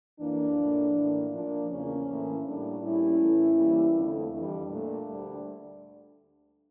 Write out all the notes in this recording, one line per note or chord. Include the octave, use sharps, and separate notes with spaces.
F2 E3 A#3 D4
A2 F3 A#3
A2 E3 A#3
A#2 F3 A#3 D4
E2 C#3 F3 A#3 C#4
A2 E3 A#3
A2 G3 A#3 D4
A2 G3 A#3 C#4 E4
A2 E3 A3
G2 E3 G3 A#3
F2 D3 A3
F2 E3 G3 D4
A#2 A3
D2 D3 G3